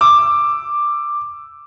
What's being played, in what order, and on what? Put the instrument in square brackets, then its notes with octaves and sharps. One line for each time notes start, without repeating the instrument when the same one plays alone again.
[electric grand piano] D6 E6